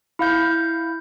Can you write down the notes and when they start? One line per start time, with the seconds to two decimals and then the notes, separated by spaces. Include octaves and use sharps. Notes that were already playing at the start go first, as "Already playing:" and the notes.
0.19 E4 F5 G6